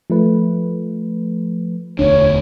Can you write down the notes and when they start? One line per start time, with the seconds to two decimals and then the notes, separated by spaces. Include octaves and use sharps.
0.10 F3 A3 B4
1.99 E1 D2 D4 C#5